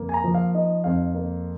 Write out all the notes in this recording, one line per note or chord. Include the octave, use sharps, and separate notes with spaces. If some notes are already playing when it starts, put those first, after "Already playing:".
Already playing: F2 A#3
G#5
A#5
F3
F5
D#4 D#5
F2 F5
A#3